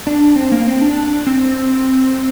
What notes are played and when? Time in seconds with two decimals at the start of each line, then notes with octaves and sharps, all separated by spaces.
0.07 D4
0.36 C4
0.52 A#3
0.67 C4
0.81 D4
1.27 C4